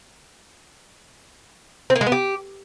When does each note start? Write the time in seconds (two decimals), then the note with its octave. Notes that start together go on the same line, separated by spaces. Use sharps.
1.90 C4
1.96 A#3
2.01 G#3
2.06 B3
2.12 G4